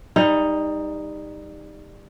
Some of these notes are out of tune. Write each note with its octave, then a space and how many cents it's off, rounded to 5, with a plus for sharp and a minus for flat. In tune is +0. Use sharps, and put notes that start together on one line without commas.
G3 +25 D#4 +0